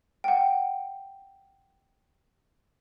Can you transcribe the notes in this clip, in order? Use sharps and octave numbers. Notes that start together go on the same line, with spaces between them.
F#5 G5